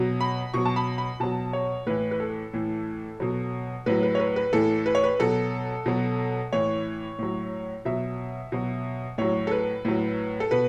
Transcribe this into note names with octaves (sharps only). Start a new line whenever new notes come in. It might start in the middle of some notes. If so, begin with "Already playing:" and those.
Already playing: B2 F#3
B5
B2 F#3 C#6
A5
B5
B5
B2 F#3 A5
C#5
A2 E3 B4
B4
A4
A2 E3
B2 F#3
A2 F#3 B4
B4
C#5
B4
B4
A2 E3 A4
B4
C#5
B4
B2 F#3 A4
B2 F#3
A2 E3 C#5
A2 F#3
B2 F#3 E5
B2 F#3
A2 F#3 C#5
A4
B4
A2 F#3
A4
B2 B4